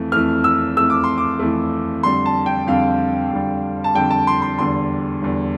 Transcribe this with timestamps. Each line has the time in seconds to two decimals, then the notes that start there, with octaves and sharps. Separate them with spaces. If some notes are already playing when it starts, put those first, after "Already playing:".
Already playing: F2 E3 A3
0.12 F2 E3 A3 F6
0.44 E6
0.77 F2 E3 A3 E6
0.90 D6
1.04 C6
1.18 D6
1.39 F2 E3 A3
2.03 F2 D3 G3 C6
2.26 A5
2.46 G5
2.67 F2 D3 G3 F5
3.31 F2 D3 G3
3.84 A5
3.95 F2 D3 G3 G5
4.11 A5
4.27 C6
4.42 C6
4.58 E2 D3 G3 C6
5.22 E2 D3 G3